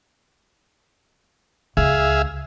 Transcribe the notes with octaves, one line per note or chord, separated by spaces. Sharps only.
C#2 G#4 E5 F5